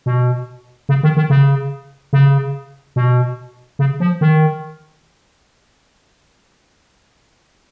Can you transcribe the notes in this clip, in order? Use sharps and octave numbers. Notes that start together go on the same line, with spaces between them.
B2
C#3
D#3
D#3
C#3
C#3
B2
C#3
F3
D#3